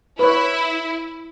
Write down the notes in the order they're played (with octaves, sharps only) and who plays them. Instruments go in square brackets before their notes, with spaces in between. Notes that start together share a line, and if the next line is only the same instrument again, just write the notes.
[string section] E4 [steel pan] B4 C#5